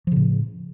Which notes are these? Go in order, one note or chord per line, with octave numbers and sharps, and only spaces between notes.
A2 C#3 F3